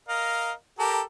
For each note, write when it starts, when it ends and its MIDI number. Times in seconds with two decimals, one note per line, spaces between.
0.09 0.52 70
0.09 0.52 75
0.09 0.52 77
0.79 1.01 67
0.79 1.01 69
0.79 1.01 70